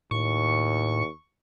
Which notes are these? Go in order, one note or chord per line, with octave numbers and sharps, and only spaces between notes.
D#2 A2 C#6